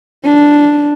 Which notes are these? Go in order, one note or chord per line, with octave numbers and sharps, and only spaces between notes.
D4